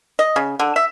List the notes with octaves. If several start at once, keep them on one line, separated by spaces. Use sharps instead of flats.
D#5
C#3
D3
E5